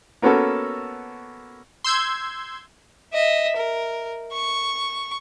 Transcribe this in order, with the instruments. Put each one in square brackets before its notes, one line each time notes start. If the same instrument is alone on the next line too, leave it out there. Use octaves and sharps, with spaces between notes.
[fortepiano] A#3 B3 C#4 F#4 A4
[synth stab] C6 E6 G6 G#6
[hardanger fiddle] D#5 E5
A#4
C#6